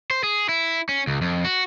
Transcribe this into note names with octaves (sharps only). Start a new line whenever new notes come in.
C5
G#4
E4
C#4
C#2
F2
F#4